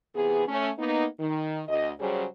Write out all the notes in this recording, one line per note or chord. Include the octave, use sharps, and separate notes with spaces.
C3 E3 B3 G#4
A3 C#4
A#3 B3 D#4
D#3
D2 D#5
C#3 F#3 G3 C#4 G#4 C5